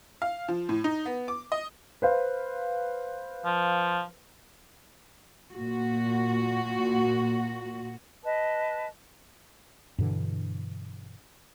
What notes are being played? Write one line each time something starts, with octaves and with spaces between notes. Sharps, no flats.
F5
F3
A2
D#4
B3
D6
D#5
B4 C5 F5
F3
A#2 F#4
B4 D#5 A5
G2 B2 D3 E3